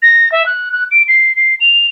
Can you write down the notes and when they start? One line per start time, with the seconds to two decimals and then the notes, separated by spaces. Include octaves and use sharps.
0.02 A#6
0.32 E5
0.46 F#6
0.72 F#6
0.91 D7
1.08 C7
1.36 C7
1.60 F7